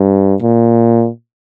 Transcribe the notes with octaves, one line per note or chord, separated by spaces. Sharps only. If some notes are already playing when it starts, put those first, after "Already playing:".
Already playing: G2
A#2